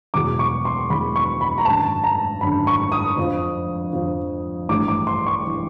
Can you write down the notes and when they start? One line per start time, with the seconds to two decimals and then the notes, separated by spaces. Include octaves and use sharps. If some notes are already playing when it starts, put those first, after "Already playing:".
0.14 E1 E2 B2 F#3 D6
0.39 C#6
0.65 C6
0.90 E1 E2 B2 F#3 B5
1.16 C#6
1.41 B5
1.58 A#5
1.65 G#1 F#2 D3 A5
2.04 A#5
2.41 G#1 F#2 D3 B5
2.67 C#6
2.92 D#6
3.17 F2 D3 F3
3.93 F2 D3 F3
4.69 A1 G2 E3 D6
4.88 D6
5.07 C6
5.26 C#6
5.47 E3